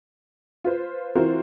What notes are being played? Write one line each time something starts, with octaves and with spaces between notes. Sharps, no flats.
F4 B4 C5
E3 C4 F4 F#4 A#4 C5